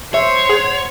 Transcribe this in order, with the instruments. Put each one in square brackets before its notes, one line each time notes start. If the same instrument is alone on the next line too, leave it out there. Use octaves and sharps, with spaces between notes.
[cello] C5 [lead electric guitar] C#5 [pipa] E5
[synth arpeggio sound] G#4 [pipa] F#5